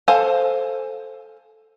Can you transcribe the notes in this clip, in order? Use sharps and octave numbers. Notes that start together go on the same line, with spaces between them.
A4 C5 F5 G#5